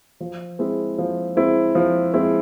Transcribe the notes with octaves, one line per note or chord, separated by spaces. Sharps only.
F3
G#3 C4 E4
F3
G#3 C4 E4
F3
G#3 C4 E4